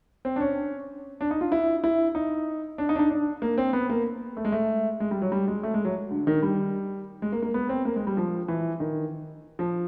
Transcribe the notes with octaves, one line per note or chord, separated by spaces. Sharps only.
C4
D4
C#4
D4
D#4
F4
E4
E4
D#4
D4
D#4
D4
D#4
D4
A#3
C4
B3
A#3
A3
G#3
A3
G#3
G3
F#3
G3
G#3
A3
G#3
F#3
D3
D#3
G3
G#3
A#3
A#3
B3
C4
A#3
G#3
G3
F3
E3
D#3
F3